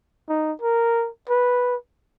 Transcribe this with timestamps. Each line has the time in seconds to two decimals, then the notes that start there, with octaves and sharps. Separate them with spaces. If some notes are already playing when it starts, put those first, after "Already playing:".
0.29 D#4
0.62 A#4
1.29 B4